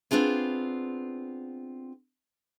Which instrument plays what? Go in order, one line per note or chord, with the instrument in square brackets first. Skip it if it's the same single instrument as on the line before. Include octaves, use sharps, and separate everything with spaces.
[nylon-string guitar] B3 C4 D4 F4 G#4